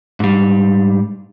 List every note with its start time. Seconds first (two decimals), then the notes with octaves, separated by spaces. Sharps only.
0.20 G#2 G3